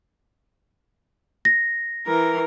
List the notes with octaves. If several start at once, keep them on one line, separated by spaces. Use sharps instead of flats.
A#6
E3 A#4